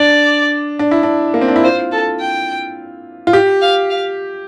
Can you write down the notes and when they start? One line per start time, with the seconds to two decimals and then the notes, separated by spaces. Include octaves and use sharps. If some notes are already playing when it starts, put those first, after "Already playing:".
Already playing: D4 D5
0.79 D4
0.91 E4
1.03 D4
1.34 A#3
1.41 C4
1.48 D4
1.56 E4
1.64 F4 C5
1.92 A4
2.20 G5
3.27 F4
3.33 G4
3.62 F5
3.90 F5